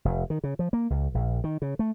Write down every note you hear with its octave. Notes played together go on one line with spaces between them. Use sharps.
F1
D#3
C#3
F3
A#3
C#2
A#1
D#3
C#3
A3